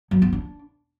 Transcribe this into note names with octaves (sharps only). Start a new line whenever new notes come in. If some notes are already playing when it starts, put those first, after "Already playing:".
F#3
B3
D4